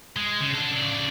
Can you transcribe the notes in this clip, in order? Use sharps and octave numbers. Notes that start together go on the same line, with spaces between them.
G#3
C#3
D4 A4
C#3 D5